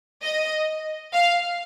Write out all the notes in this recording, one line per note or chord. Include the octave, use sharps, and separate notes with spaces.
D#5
F5